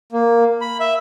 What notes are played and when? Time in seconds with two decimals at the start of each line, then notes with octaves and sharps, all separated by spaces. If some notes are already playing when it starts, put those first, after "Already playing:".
0.12 A#3
0.61 B5
0.80 E5